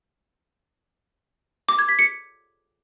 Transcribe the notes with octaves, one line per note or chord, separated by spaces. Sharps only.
D6
G#6
B6
C#7